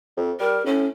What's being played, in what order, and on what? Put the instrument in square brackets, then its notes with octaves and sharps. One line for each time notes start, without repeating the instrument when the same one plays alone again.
[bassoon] F2
[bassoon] G3 [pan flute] A#4
[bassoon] A2 [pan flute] C#4